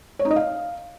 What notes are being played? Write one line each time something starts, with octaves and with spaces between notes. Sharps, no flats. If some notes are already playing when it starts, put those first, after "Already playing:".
C#5
D#4
D#5
F5